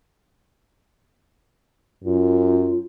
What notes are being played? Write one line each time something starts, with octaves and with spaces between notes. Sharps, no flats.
F#2 F4